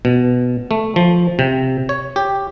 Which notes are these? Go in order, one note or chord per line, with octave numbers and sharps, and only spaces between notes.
B2
A3
F3
C3
C#5
G4